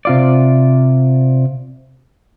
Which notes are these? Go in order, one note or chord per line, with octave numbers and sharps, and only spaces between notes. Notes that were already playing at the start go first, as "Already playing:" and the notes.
C3 F4 D5